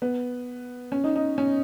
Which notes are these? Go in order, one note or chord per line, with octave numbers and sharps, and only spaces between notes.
B3
C#4
D#4
D#4
C#4